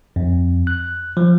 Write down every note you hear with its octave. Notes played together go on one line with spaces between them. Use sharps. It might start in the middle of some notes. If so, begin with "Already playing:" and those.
F2
F#6
F3